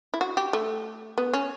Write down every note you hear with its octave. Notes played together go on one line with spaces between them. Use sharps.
E4
F#4
G4
A3
B3
C#4